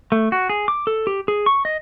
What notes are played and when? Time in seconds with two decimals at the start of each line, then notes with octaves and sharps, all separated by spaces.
0.12 A3
0.32 F#4
0.49 G#4
0.68 D6
0.87 A4
1.07 G4
1.28 G#4
1.46 C#6
1.65 D#5